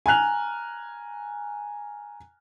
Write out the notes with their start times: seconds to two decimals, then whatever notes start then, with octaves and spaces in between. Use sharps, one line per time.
0.06 G#5 A#5 F6 F#6 F7